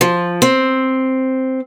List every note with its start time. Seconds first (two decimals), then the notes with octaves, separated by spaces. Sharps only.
0.01 F3
0.42 C4